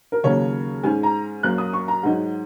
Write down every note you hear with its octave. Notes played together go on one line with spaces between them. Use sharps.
A#4
D#2 C#3 F#3 A#3 C#5
G#2 G#3 C#4 G#5
A#5
F#2 F#3 A#3 F#6
D#6
C#6
A#5
G#2 F#3 D#4 F#5